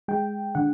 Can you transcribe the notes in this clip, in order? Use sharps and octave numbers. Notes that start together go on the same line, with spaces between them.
G#3 G5
D3 F#5